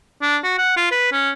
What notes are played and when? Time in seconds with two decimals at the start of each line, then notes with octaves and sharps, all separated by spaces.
0.22 D4
0.43 F#4
0.58 F#5
0.77 F4
0.91 B4
1.12 C#4